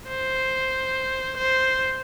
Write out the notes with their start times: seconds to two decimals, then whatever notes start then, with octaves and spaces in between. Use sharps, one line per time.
0.09 C5
1.38 C5